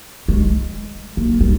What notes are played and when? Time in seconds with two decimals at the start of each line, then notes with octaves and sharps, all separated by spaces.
0.28 G#3
1.17 A#3
1.41 G3